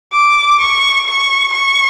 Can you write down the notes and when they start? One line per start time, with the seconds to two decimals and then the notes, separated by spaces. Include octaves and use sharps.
0.13 D6
0.60 C#6
1.07 C#6
1.53 C#6